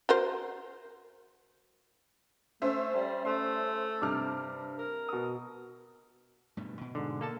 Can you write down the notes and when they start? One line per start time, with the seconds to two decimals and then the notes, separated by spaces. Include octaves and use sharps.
0.09 F#4 A#4 C5
2.62 A3 C#4 C5 E5
2.95 G3
3.25 A3 C6
4.02 G2 C3 D6 F6
4.78 A#4
5.09 B2 D#6
6.57 G2 B2 A3
6.81 B2
6.95 G#2 D3
7.21 A#3 A4 A5